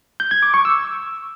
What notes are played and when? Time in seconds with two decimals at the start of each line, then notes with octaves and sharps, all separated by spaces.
0.20 G6
0.31 G#6
0.42 D6
0.54 C#6
0.65 E6